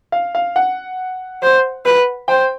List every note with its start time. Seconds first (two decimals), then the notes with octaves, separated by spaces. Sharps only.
0.12 F5
0.35 F5
0.56 F#5
1.43 C5
1.85 B4
2.28 C5 G5